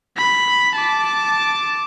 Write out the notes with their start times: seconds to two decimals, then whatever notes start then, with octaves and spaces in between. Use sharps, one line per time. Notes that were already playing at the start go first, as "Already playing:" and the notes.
0.17 B5
0.76 A5 D6